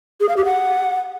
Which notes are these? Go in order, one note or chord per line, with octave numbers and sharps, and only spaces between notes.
G#4
F5
G4
F#5